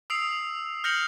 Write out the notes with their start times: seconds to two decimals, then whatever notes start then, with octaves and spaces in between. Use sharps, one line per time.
0.10 D#6 E6 C7 D7 F7
0.84 F6 G6 A#6 C#7 F7 F#7